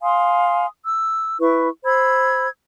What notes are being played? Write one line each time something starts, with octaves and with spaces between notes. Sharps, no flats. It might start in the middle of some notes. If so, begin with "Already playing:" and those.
F5 G#5 C6 D#6
E6
E4 B4 C#6
C5 B5 E6 G#6